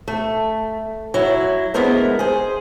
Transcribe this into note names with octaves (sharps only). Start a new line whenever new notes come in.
A3
F#3 E4
D2 G#3 B3 E4 A#4 C5
G#4 C5